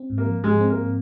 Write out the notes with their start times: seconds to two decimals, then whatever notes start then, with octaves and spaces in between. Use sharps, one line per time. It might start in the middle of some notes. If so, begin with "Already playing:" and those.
Already playing: C4
0.10 G#2
0.18 A#3
0.26 F3
0.44 G#2 G#3
0.61 C4
0.70 A#3